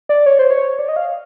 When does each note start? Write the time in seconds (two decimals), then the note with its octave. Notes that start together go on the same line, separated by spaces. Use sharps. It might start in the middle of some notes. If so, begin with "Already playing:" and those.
0.09 D5
0.26 C#5
0.39 C5
0.51 C#5
0.79 D5
0.89 D#5
0.96 F5